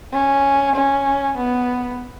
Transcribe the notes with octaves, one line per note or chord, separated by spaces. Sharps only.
C#4
C#4
B3